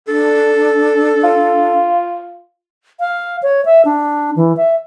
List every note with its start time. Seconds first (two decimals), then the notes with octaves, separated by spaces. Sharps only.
0.08 D4 A4
1.24 F4
3.00 F5
3.43 C#5
3.65 E5
3.85 D4
4.36 E3
4.57 E5